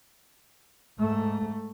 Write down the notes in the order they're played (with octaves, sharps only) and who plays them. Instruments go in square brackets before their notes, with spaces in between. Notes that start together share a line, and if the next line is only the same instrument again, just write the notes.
[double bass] G#2 A3